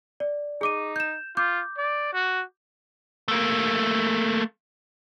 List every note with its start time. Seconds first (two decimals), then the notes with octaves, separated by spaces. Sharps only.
0.20 D5
0.61 D#4 G#4 D6 D#7
0.96 G6 E7
1.37 F4 D6 G6
1.77 D5
2.13 F#4
3.28 A3 A#3